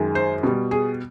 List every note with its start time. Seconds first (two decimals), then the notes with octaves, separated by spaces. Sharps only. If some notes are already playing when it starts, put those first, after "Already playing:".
Already playing: F#2 D#3 G#3
0.15 C5
0.43 B2 G3
0.71 G#4